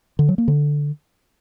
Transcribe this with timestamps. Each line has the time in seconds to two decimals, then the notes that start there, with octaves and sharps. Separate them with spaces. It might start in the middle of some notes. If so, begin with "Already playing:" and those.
0.19 D3
0.28 F#3
0.38 A#3
0.48 D3